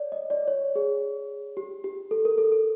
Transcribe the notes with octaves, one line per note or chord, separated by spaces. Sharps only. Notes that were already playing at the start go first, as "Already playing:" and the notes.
Already playing: C#5 D5
D#5
D5
C#5
G#4
G4
G4
A4
A#4
A4
A4